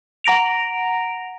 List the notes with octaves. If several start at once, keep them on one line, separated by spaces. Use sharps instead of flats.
F#5 A#5 A#6 D7 F7